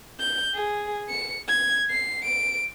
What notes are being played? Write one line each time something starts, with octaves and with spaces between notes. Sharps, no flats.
G6
G#4
C#7
G#6
C7
D7